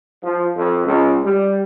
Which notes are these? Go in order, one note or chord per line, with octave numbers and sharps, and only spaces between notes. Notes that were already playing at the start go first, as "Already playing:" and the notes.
F3
F2
C#2
G3